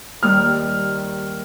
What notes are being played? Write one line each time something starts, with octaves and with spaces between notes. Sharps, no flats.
D#2 G3 F6